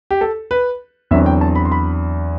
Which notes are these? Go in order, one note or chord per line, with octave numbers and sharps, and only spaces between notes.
G4
A4
B4
E2 D3 F#3 C4 E5
G5
A5
B5
C6
B5